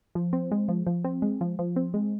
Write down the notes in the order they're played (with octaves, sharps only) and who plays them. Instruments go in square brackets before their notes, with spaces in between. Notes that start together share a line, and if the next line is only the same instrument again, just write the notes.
[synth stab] F3
C4
G#3
F3
F3
C4
G#3
F3
F3
C4
G#3